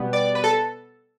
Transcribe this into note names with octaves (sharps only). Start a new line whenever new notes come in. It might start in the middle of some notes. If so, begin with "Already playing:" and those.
Already playing: B2 G3 B3
D5
B4
A4